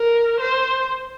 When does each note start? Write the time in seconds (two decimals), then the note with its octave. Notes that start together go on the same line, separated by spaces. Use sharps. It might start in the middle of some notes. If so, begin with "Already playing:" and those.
Already playing: A#4
0.40 C5